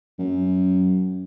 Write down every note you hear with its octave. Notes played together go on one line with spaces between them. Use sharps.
F#2